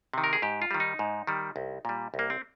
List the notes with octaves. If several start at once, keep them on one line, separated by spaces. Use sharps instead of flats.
C3 D#3
A#4
G#4
G#2 G4
F4
D#3 G3
D#4
G#2
D#3 G3
C2
A#2 G3
C2
A#3
C4